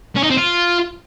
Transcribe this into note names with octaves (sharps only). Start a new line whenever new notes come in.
C#4
D#4
C4
F4